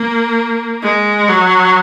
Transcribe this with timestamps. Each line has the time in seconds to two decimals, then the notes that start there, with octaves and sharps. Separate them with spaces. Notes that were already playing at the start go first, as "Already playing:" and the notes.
Already playing: A#3
0.83 G#3
1.29 F#3